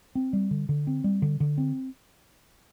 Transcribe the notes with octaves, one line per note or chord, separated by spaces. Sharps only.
C4
G3
D3
D3
C4
G3
D3
D3
C4